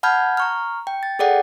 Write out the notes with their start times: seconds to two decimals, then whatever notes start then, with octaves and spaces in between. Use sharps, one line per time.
0.03 F#5 A5 B5 F6 G6 G#6
0.37 A#5 C#6 F6
0.87 G5
1.03 A6
1.19 G#4 A4 D5 F#5 G5